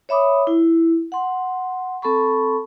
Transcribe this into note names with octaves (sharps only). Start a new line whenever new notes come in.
C#5 E5 B5 D6 D#6
E4
F#5 C6
C4 A4 A5 B5 C#6